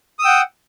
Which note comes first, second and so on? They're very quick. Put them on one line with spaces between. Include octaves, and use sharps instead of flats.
D#6 E6 G5 F#5